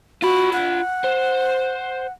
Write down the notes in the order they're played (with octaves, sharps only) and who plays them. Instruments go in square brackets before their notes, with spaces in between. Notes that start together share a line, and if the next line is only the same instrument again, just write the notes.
[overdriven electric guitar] F4 B5 [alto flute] F#4
[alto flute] F#5
[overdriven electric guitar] C5